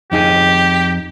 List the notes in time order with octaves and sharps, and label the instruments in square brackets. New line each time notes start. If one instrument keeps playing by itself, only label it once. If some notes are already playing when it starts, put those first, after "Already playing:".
[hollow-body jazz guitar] F2 D#4 G#4 [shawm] G4